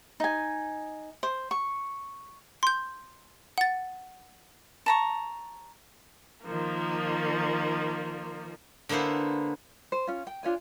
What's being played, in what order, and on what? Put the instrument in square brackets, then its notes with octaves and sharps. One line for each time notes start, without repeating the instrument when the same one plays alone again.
[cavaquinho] D#4 G#5
C5
C#6
[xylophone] C6 G6
F#5 A6
[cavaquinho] A5 A#5 C#6
[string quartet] D#3 F3 A#3
[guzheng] D3 A#3 B3 E4 C5
[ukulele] C5
C#4 F4
G5
D4 F4 C#5 G#5